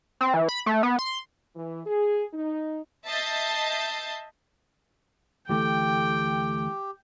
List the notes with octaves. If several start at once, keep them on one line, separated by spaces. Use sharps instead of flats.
C4
E3
B5
A3
B3
C6
E3
G#4
D#4
D#5 E5 A5 G6 A6 C7
D2 E3 A3 G4 G5